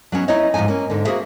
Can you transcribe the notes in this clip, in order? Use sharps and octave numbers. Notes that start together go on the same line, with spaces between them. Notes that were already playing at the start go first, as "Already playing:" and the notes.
F#3 B3 C#4 D#4
C#4 D#4 E4 B4 C#5 D#5
G#2 F3 F#3 D#4 G#5
A#3 C#4
G#2 D3
A#3 F#4 G#4 C5 E5